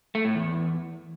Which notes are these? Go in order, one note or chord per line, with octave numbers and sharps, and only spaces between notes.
A3
A2
E2